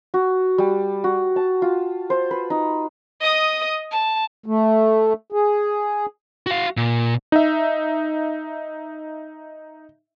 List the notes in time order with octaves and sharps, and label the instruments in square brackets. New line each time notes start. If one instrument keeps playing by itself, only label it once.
[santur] F#4
G3
F#4
A5
F4
C5
B4
D#4
[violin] D#5 D#6
A5
[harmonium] A3
G#4
[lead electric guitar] F#4 F5
A#2
[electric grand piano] D#4 E5